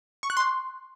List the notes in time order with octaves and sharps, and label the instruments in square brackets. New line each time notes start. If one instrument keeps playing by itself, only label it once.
[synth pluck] C#6
F#6
C6